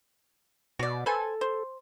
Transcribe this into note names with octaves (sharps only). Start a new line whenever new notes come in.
B2 F#4 D5
A4 B4 C5 G#5
C5